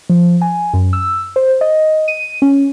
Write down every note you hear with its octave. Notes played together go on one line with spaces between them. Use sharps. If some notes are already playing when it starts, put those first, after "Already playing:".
F3
G#5
F#2
E6
C5
D#5
D#7
C#4